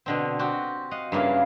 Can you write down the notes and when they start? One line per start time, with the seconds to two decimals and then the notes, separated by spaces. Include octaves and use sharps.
0.06 B2 D3 C4
0.39 C4 F#4 G4
0.91 D#5 F5 F#5
1.12 G2 C#3 A#3 E4 F5